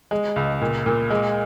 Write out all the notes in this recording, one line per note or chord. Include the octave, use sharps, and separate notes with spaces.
G#3
C#2
A#2
A#2
G#3